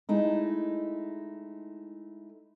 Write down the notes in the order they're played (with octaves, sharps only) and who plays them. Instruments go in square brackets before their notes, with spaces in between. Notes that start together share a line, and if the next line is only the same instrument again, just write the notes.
[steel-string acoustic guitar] G#3 A3 D#4 E4